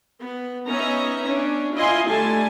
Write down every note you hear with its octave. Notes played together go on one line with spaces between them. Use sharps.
B3
B3 C#4 D#4 E5 A#5
C#4 D4
E4 F4 D#5 G#5 C6
D3 G3 A3 G#5 A5